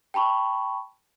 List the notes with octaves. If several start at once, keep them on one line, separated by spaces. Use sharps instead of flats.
G5 A5 B5 C#6